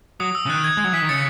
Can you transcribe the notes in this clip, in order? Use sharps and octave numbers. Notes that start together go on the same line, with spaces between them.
F#3 D#6
E6
C#3
D#3 F#6
G#6
G#3 G#6
F#3
E3 B6
D#3
C#3 A6 C#7